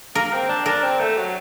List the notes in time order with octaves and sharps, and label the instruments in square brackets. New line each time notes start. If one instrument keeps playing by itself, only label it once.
[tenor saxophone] A#3 [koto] A#4
[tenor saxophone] C4
D4
[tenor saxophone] D4 [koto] A#4
[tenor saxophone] C4
A3
F#3